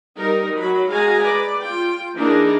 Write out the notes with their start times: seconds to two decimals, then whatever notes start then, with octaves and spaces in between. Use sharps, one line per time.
0.16 G3 D#4 A#4
0.55 F#3 B5
0.90 G#3 F#4 F5 G#5 A#5
1.21 B4 D5
1.61 F4 G5
2.17 E3 A#3 D4 D#4 G#4 A#4